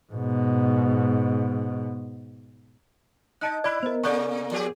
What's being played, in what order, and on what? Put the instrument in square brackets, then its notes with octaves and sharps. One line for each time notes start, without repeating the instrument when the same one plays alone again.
[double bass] G#2 B2
[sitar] D#4 [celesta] D#5 A5 F#6
[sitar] E4 [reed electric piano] D5 B5 F#6 [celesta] G#6
[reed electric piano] B3 A#4 [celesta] C5 D#5
[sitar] C3 A#3 [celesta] A4 D5 C#6
[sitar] F3 G4 G#4